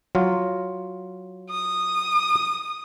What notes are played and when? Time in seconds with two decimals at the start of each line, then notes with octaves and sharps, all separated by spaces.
0.15 F#3 F4
1.50 D#6